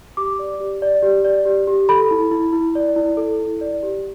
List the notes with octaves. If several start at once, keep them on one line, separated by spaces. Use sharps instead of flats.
G4 D6
D5
G4
D5
G4
D5
G4
G4
A4 B5
E4
E4
E4
D5
E4
A4
E4
D5
G4